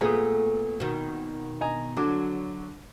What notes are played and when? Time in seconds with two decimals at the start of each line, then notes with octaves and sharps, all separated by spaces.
0.01 A#2 A3 B3 G#4 D#6
0.80 B2 D#3
1.61 D#5 G#5 A#5
1.97 D3 F#3 D4 D6